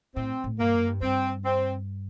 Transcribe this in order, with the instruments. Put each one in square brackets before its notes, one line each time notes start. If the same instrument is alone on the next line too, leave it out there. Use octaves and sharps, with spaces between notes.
[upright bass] A2 [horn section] C4
[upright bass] A2
[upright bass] G2 [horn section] A#3
[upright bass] F#2
G2
[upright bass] G2 [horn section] C4
[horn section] C4